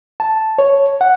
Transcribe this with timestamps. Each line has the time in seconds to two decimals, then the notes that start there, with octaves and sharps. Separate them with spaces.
0.20 A5
0.58 C#5
1.01 F#5